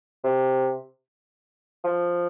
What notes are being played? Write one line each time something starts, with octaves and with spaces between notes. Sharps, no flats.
C3
F3